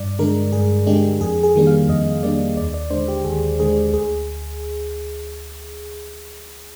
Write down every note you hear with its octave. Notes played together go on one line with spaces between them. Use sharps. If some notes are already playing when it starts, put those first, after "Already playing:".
Already playing: G2 D5
D3 G#3 D4 A#4
G2 G#4
D3 G#3 D4 G4
F2 G#4
G#4
D#3 G3 A#3 D4
F5
F2 D#5
D#3 G3 A#3 D4 D5
D#2 D5
D5
D3 G#3 D4 C5
G4
D#2 G#4
D3 G#3 D4 G#4
D2 G#4